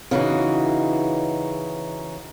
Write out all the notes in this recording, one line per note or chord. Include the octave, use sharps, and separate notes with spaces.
C#3 E3 D#4 F#4